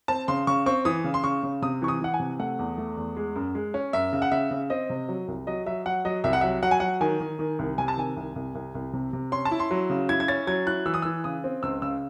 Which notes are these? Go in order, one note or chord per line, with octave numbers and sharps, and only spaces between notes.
C4 A5
C#3 C6
C#3 C#6
C4 C#6
E3 D#6
C#3
C6
C#3 C#6
C#3
C3 D#6
E3 C#6
D#6
E3 F#5
G#5
C3
A3 F#5
E2
A3
E2
G#3
F#2
G#3
C#4
F#2 E5
C#3
F#5
C#3 E5
C#3
C4 D#5
C3
F#3
C2
F#3 D#5
F#3 E5
F#3 F#5
F#3 D#5
C2 E5
F#5
F#3 E5
F#3 F#5
G#5
F#3 F#5
D#3 G#5
D#3
D#3
C2
C3 G#5
A5
D#3 G#5
C2
C2
C2
C2
C3
C3
C#4 C6
A5
E4
C6
F#3
C#3
E4 G#6
G#6
C#4 A6
F#3 G#6
E4 F#6
E3 E6
D#6
E3 E6
C#3 D#6
C4
C#2 E6
C#3 E6